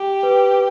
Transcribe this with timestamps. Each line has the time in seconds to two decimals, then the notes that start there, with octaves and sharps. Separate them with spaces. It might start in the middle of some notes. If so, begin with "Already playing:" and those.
Already playing: G4
0.23 B4